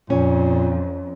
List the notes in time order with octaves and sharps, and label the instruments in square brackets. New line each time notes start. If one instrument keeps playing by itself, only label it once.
[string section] F2 [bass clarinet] A#2 [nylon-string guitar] C#4